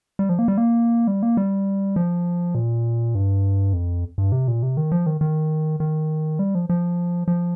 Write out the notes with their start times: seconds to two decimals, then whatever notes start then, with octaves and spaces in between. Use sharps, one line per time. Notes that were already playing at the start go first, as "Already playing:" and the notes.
0.19 G3
0.29 F3
0.39 A#3
0.48 G3
0.58 A#3
1.07 G3
1.23 A#3
1.37 G3
1.96 F3
2.55 A#2
3.15 G2
3.73 F2
4.18 G2
4.32 C3
4.48 A#2
4.63 C3
4.77 D#3
4.92 F3
5.06 D#3
5.21 D#3
5.80 D#3
6.39 G3
6.55 F3
6.70 F3
7.28 F3